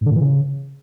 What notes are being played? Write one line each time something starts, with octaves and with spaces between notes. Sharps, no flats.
G#2
D3
A2
E3
C#3